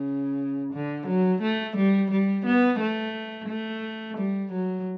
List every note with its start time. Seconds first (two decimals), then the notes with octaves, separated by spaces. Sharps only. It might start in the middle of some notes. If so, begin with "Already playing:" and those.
Already playing: C#3
0.73 D3
1.07 F#3
1.42 A3
1.76 G3
2.11 G3
2.45 B3
2.80 A3
3.48 A3
4.18 G3
4.52 F#3